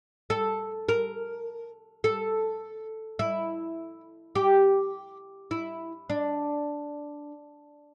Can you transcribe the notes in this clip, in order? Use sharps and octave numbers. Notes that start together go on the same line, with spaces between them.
A4
A#4
A4
E4
G4
E4
D4